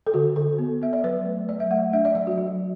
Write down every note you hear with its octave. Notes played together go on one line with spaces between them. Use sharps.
A4
D3 F#4
D3 A4
B3
B3 E5
D5
F#3 B4
A3
F#3 D5
E5
A3 F#5
D4 E5
D5
F#3 D5
F#4
F#3